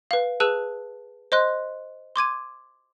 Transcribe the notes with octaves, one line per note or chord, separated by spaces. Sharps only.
B4 F5
G#4 B4 A5 E6 F#6 D#7
C5 D#5 C6 F#6
C6 D6 G#6 D#7